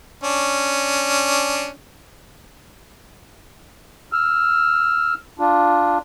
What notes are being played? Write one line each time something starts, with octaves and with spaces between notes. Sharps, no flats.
C#4 D4
E6 F6
D4 F4